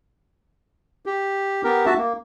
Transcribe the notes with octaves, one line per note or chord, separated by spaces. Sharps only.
G4
B3 G4 A#4
F#4 E5 A5
A#3